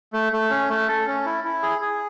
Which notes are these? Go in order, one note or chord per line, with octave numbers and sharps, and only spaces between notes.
A3
A3
C#4
A3
A4
C#4
E4
E4
G#4
G#4